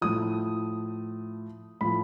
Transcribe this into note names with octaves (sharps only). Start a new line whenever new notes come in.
A2 F3 D#6
A2 F3 B5